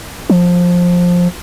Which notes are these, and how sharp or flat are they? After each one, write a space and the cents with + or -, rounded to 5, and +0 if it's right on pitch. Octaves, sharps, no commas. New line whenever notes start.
F3 +15